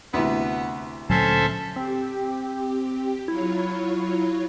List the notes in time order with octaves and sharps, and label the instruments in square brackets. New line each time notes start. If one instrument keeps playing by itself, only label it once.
[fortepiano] D2 C3 E3 [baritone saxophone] B3
[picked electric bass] D2 A#2 F#3 [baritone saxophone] C#4 [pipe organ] A4 C5 E5
[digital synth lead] C4 [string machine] G4
[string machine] F#3 F4 C#5 [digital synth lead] E4